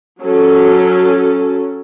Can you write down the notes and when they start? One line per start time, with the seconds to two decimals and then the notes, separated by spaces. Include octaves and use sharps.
0.21 F#3 C#4 A4